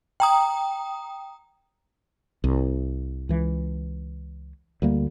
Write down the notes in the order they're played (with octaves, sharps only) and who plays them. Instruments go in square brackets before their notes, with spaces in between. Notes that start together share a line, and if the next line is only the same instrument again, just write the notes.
[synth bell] G5 A#5 D#6
[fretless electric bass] C2
C#2 E3
D2 G3 A#3